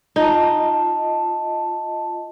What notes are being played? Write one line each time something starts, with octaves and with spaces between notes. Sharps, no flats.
D#4 F4 D#5 A5